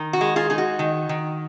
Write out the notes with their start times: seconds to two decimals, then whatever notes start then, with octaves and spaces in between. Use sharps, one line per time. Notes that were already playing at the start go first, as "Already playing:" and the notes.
Already playing: D#3
0.13 F#4
0.21 G#3
0.36 F4 G#4
0.50 D#4 G#4
0.58 F#4
0.79 D#3
1.09 D#3